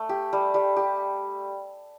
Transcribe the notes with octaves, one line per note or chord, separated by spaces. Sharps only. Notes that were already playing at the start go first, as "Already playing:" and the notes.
Already playing: A3
G4
G3
G3
G4